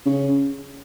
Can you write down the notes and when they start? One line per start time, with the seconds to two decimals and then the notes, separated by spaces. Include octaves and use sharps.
0.06 C#3